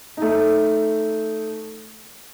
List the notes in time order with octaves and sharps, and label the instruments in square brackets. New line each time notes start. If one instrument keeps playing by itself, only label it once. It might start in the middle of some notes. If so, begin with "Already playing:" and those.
[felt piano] A3 D#4